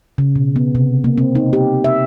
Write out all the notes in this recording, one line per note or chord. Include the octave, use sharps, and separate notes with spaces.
C#3
B2
B3
C3
A#3
C4
D#4
G4
E5